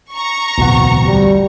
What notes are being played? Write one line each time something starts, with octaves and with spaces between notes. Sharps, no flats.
A#5 C#6
D1 B1 E2 F#5
G3